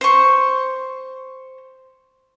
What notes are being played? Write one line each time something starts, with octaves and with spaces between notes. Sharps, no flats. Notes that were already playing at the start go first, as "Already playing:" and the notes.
C5 C#6